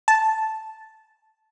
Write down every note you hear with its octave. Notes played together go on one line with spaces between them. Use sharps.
A5